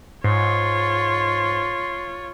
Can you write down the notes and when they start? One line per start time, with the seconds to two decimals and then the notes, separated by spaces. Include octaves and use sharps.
0.24 G#2 F4 C#5 C6